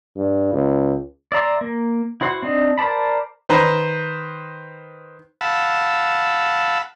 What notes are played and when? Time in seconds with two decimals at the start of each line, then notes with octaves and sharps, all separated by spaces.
0.17 G2
0.53 C#2
1.32 D5 E5 A#5 C6
1.61 A#3
2.21 E4 F#4 C5 F#5
2.43 C4 D4 D#4
2.78 A#4 C5 D5 A5 B5
3.49 D#3 B4 C5 A#5
5.41 F5 F#5 A5 B5 E6